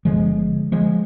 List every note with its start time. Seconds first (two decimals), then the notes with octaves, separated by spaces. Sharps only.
0.05 G1 G2 D3 F3 G#3
0.72 F3 G#3